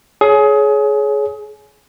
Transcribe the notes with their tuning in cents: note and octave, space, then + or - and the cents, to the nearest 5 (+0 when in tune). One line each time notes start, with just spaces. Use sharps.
G#4 +25 C#5 +10